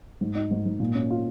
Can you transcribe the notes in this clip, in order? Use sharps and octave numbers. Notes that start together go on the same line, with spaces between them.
G#2
D#4
G#2
G#2
A#2
C#4
F4